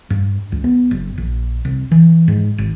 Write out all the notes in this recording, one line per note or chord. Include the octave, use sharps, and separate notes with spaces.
G2
C#2
B3
F#1
A#1
C2
E3
G#2
G#1